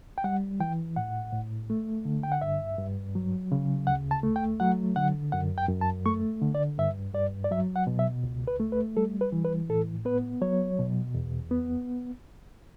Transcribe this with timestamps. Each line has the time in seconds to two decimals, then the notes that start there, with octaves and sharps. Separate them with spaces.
0.18 G5
0.24 G3 F#5
0.60 E3 G5
0.96 A2 F#5
1.33 A2
1.70 A3
2.05 D3
2.23 G5
2.32 F#5
2.41 G2 E5
2.78 G2
3.15 F#3
3.52 C#3
3.87 D2 F#5
4.11 A5
4.23 A3
4.36 G5
4.60 F#3 F#5
4.96 D3 F#5
5.32 F#2 F#5
5.58 G5
5.69 F#2
5.81 A5
6.06 A3 C#6
6.41 D3
6.55 D5
6.78 G2 E5
7.14 G2 D5
7.44 D5
7.51 F#3 E5
7.76 F#5
7.87 B2
7.99 E5
8.23 C#2
8.47 B4
8.60 A3
8.72 B4
8.97 G3 A4
9.21 B4
9.32 E3
9.44 B4
9.69 A2 A4
10.05 B3 B4
10.41 F#3 C#5
10.79 B2
11.15 E2
11.51 B3